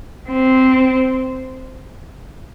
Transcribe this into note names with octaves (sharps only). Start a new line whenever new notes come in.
C4